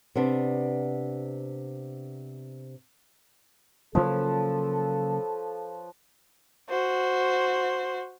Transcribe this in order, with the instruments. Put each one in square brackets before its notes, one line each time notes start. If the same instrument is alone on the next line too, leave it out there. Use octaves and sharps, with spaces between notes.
[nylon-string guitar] C3 B3 D4
[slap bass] C#3 F#3 A#3 [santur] F3 B4 C#5 [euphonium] A4
[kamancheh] F#4 C5